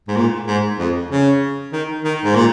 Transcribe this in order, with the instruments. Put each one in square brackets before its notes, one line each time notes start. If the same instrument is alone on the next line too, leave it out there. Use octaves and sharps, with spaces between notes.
[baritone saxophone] G#2
A#2
G#2
F2
C#3
D#3
D#3
G#2
A#2